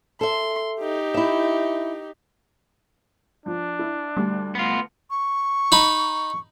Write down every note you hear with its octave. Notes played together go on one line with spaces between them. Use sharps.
A4 E5 C6
D#4 G4
E4 E5
F3 D4
E4
D2 G3
B3 F4
C#6
D#4 B5